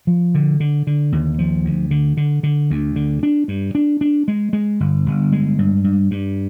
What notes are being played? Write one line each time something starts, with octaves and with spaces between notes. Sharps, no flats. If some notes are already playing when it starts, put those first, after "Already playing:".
F3
D3
D3
D3
D#2
F3
D2
D3
D3
D3
D2
D3
D4
G2
D4
D4
G#3
G#3
G1
G1
G#3
G2
G2
G2